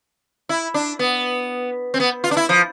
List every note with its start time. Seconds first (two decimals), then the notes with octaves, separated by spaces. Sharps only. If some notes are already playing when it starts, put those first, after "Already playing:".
0.49 E4
0.74 D4
0.99 B3
1.94 C4
2.00 B3
2.24 F4
2.31 D4
2.37 E4
2.49 F3